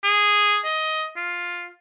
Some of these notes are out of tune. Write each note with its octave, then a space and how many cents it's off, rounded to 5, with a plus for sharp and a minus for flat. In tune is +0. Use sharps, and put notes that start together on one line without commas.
G#4 -5
D#5 +15
F4 +5